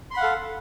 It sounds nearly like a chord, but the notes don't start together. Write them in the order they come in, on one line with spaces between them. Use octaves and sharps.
C6 B5 F#5 F5 A4